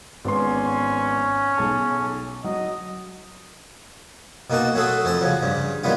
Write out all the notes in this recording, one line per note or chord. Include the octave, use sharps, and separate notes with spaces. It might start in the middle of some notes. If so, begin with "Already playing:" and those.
G#1 B3 C#4 C6
B1 G#4 A5
F#3 D#5
B2 A#3 D#4 F#4 A5
F#3 A3 F#4 A4 C6 D#6
F2 C5 A5
C#3 F3 F#3
G2 C#3
D#3 F#3 G3 B3 F4